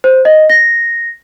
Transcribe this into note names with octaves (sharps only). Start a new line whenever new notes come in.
C5
D#5
A#6